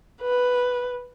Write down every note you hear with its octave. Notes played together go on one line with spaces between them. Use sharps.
B4